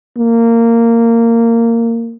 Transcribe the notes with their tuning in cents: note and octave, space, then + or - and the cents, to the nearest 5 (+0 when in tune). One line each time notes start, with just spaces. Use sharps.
A#3 -15